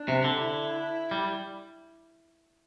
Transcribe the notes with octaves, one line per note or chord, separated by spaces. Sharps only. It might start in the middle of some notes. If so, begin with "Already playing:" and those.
Already playing: D4
C3
D3
E4
G3